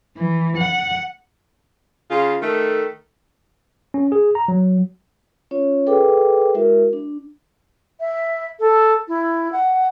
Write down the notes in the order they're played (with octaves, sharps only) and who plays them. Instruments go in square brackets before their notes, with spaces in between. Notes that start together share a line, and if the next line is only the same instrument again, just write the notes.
[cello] E3
F#5
[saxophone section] C#3 F4
D#3 A3
[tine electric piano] C#4
G#4
A#5
F#3
[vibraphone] C#4 F4 C#5
G#4 A4 B4 E5 G5 D6
G#3 E4 F#4 A#4 E5
D4
[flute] E5
A4
E4
F#5